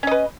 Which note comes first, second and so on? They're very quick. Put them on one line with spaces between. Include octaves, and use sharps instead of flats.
C#4 D#5 B4